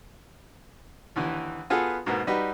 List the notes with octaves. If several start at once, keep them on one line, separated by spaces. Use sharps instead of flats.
D#2 D3 E3
B3 F4 F#4 G#4 A4 B4
G#2 B2 A#3 B3
G3 D#4 F#4 B4